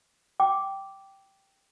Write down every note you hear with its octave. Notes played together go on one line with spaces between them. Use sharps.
G5 D6